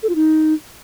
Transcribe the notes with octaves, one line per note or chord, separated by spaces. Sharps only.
A4
F4
D#4